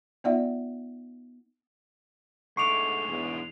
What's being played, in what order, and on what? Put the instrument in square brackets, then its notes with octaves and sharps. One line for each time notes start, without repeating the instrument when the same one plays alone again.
[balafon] B3 D#4 F4 D5 E5 F#5
[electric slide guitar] G#2 G#3 D4 [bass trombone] A3 [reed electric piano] C#6 D6 [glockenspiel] C7 F7
[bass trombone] E2